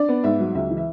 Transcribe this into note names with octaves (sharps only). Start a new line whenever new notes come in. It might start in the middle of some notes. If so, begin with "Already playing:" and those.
Already playing: D4 D5
B3
G#2 E5
F#3
C#2 E5
E3
E5